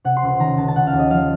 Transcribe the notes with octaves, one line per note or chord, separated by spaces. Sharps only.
C3 F#5
C6
C#2
C6
D#3 A#5
C#2 A5
A5
C#3 F#5
F5
D#2
D#5
F3 F5